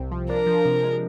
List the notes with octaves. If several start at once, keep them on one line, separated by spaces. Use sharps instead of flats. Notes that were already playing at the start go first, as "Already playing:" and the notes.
Already playing: C2 C3 C4
F3
D4 A#4
F3
C3
G#3